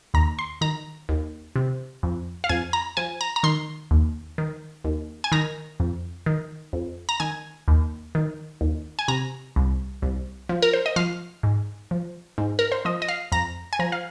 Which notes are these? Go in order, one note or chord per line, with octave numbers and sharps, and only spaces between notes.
D#2 A#5
C6
D#3 A#5
D#2
C3
F2
F5
F2 G#5
A#5
F3 G#5
A#5
A#5
D#3 C6
D#2
D#3
D#2
G#5
D#3 A#5
F2
D#3
F2
A#5
D#3 G#5
D#2
D#3
D#2
G#5
C3 A#5
C2
C2
F3
A#4
C5
D#5
F3 F5
G#2
F3
G#2
A#4
C5
F3 D#5
D#5
F5
F2 A#5
G#5
F3 A#5
F5